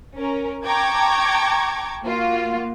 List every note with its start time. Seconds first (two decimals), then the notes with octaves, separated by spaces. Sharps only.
0.16 C#4 A#4
0.66 G5 A5 A#5 C#6 D6 G#6
2.04 A#3 F4 F#4